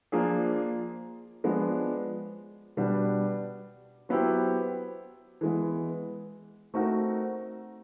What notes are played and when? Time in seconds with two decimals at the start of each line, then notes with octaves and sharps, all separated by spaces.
0.12 F3 A#3 D4 F4 G#4
1.44 F3 G#3 B3 D4
2.77 B2 G3 B3 D4
4.09 F#3 B3 E4 G4 C5
5.41 E3 G#3 B3
6.74 A3 C4 D#4 F#4 A#4